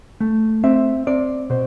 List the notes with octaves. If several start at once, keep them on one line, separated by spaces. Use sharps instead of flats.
A3
C4 E5
C4 D5
B2 C5